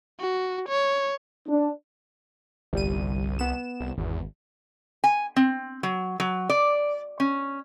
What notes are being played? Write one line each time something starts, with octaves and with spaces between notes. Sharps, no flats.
F#4
C#5
D4
G1 C2 G3 D#7
B3 E7
C2
G#1 E2
G#5
C4
F#3
F#3
D5
C#4